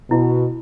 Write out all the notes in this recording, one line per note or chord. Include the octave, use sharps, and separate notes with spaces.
B2 E4